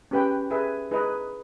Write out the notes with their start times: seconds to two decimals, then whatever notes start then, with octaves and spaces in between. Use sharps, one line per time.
0.11 C#4 G4 B4 G5
0.51 G#4 B4 E5
0.91 D#4 G#4 B4 D#5